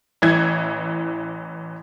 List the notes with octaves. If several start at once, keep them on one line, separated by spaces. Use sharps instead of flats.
A1 E3 G#6